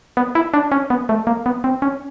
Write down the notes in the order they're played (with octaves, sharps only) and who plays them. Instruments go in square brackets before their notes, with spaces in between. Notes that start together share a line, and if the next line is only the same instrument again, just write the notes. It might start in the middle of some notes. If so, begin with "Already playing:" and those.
[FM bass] B3
E4
D4
C#4
B3
A3
A#3
B3
C4
C#4